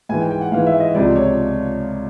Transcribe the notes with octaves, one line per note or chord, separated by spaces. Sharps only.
G#2 E3 G#5
G5
G5
F#5
G#2 E3 F5
E5
D#5
C#2 C3 F3 D5
C#5